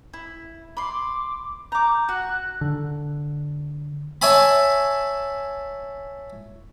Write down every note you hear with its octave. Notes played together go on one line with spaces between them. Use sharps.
E4
B5 C6 D6
A#5 D6 G6
F#4 F#6
D3
C#5 E5 G#5 A5 B5